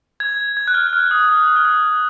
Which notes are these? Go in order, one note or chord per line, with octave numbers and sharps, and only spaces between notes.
G#6
G#6
F#6
F6
F6
D#6
D#6
D#6
F6
D#6